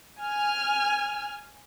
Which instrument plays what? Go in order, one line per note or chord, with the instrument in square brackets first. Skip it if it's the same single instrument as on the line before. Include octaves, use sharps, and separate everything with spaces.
[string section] G#5 F6